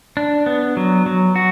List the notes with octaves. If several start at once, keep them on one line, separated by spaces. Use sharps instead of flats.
D4
B3
F#3
F#3
F#4